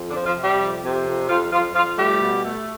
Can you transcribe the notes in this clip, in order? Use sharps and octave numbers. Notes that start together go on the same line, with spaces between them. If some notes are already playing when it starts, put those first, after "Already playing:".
Already playing: F2
D3 D4
F3
F3 F4
C3
G3 G4
F2
C3
F2
F2 F3 F4
F2 F3 F4
F2 F3 F4
G3 A3 G4
B2
A3